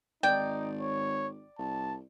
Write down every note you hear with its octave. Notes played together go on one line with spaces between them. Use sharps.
G#1 D#4 D5 G5
C#5
C2 A5